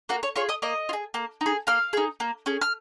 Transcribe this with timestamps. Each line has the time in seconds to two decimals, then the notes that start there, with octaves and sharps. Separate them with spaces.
0.09 A#3 F#4 F#5
0.23 C#5 C#6
0.36 F4 G#4 C#5 C#6
0.49 D#5 D#6
0.62 A#3 D#5 D#6
0.89 F4
0.93 G#4
1.14 A#3
1.41 D#4
1.46 G#4
1.67 A#3 F5 F6
1.93 D#4 G#4
2.20 A#3
2.46 C#4 G#4
2.61 F6